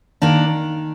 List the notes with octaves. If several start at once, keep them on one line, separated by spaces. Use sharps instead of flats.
D#3 A#3 D4